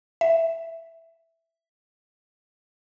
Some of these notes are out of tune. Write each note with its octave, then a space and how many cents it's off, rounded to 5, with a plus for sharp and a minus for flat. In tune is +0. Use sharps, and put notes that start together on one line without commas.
E5 +0